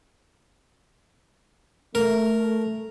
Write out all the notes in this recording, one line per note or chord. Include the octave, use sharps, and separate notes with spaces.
A3 A#4